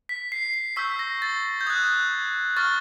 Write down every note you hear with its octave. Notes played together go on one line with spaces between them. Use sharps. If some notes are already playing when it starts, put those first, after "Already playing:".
B6
C7
C7
C#6 E6 G6 B6
A#6
A6
G6
D#6 F#6 G#6
C#6 F6 A6